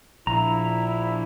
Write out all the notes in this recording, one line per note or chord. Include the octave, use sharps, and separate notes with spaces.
A#1 E4 A#5